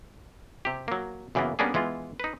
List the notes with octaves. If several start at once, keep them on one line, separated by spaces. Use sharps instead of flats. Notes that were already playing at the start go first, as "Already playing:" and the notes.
C3 G4
F#3 A#3
F#2 C#3 E3 A#3 B3
G3 A#3 B3 C#4 D4 G#4
E3 G#3 B3 F4
D#4 B4